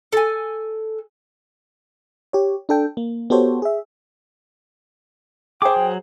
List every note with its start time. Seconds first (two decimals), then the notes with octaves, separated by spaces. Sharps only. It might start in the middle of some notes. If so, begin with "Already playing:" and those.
0.13 A4 G#5
2.33 G4 C#5
2.69 D4 A4 G5
2.97 A#3
3.30 B3 F#4 G4 A4 C5 C#5
3.62 G#4 E5
5.62 G#4 C5 G5 D6
5.76 F#3